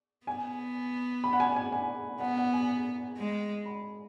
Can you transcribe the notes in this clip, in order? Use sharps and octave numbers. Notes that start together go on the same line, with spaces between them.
B3 G#5
B5
F#5
G#5
G#5
G#5
B3 F#5
F#5
G#5
G#3
B5